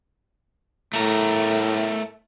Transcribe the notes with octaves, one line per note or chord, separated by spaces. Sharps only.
A2 A3 A#4